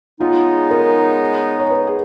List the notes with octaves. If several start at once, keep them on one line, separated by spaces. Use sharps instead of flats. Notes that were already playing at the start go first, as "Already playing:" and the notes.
C#3 G#3 B3 D#4 F4
A#4
C#5
B4
G#4